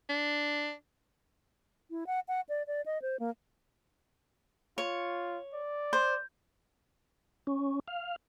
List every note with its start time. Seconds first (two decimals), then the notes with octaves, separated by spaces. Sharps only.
0.09 D4
1.90 E4
2.07 F#5
2.28 F#5
2.49 D5
2.67 D5
2.86 D#5
3.02 C5
3.19 A#3
4.78 F4 C#5
5.54 D5
5.93 C5
7.47 C#4
7.88 F5